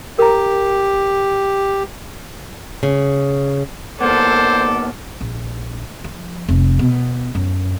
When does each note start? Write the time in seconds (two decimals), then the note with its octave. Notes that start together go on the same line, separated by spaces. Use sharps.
0.19 G4 A#4 A#5
2.83 C#3
4.01 D#2 A#3 B3 A4 C5 D5
5.21 A#1
6.04 F3
6.48 F1
6.79 B2
7.35 F#2